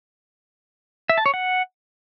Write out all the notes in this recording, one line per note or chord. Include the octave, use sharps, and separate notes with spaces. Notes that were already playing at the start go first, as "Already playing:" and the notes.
E5
A5
C#5
F#5